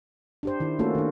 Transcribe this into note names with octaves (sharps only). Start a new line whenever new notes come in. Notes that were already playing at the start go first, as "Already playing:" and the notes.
D4 G4 C5
D#3 E4
A3 A#3 C#4 F4 F#4 A4
D#3 D4